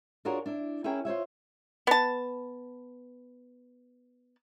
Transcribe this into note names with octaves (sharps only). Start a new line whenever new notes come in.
D4 F4 F#4 G#4 A#4 C#5
D4 E4
C#4 E4 G#4 A#4 C#5 G5
F4 C5 C#5 E5
B3 A5